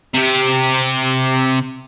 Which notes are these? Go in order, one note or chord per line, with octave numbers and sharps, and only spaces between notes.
C3 G4